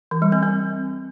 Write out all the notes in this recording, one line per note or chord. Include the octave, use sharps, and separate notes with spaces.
E3
G3
C4
C4